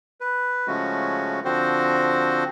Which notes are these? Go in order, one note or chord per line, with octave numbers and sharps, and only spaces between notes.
B4
C#3 F3 G#3 A3 C#4 F#4
D3 F3 C4 F#4 C5